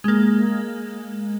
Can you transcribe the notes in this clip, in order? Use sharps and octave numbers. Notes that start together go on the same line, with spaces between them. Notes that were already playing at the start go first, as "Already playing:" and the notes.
G#3 A#3